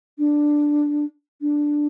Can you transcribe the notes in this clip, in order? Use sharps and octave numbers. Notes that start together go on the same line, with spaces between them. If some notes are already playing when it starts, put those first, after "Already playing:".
D4
D4